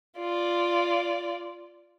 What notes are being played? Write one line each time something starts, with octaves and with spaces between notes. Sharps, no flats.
F4 D5